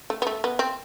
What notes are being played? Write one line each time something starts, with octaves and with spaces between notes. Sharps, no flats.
A3
B3
A3
B3
C4